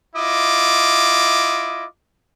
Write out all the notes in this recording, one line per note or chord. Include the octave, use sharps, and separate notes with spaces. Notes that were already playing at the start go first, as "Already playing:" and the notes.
E4 F4 D#5 D6